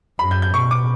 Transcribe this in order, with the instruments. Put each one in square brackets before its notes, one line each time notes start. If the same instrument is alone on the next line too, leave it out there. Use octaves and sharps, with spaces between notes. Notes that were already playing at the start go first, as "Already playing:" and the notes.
[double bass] F#2 [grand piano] B5
[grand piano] G6
G6
[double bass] B2 [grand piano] C#6
[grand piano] D6